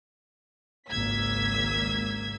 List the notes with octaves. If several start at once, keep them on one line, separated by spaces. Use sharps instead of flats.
G#1 C#2 A#3 E6 G#6 B6